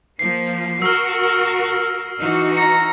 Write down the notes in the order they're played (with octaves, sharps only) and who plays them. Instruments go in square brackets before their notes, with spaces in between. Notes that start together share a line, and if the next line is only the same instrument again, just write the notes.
[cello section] F3 A#3 [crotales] C7
[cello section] F#4 A#4 [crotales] E6 F6
[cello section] E3 D#4 F#4
[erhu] A#5 [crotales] C#7